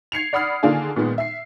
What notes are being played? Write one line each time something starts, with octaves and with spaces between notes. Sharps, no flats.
G#6 C7 C#7 F7
D5 F#5 B5 D#6 F6 C7
D3 D#3 A#3 D4 F4 G#4
A#2 D#3 G#3 B3
E5 C7